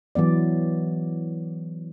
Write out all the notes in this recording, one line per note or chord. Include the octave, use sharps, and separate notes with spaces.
E3 F#3 B3 D5